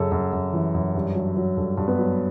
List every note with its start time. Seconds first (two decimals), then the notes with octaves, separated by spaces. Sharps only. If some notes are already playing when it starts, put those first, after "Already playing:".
Already playing: F#2 C#3 A4
0.12 F#2
0.33 F#2
0.53 E3
0.75 F#2
0.95 G2
1.15 F#3
1.37 F#3
1.57 G2 A4
1.77 G2
1.88 B3 B4
1.99 F#3